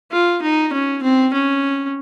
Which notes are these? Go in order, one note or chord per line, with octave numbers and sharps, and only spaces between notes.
F4
D#4
C#4
C4
C#4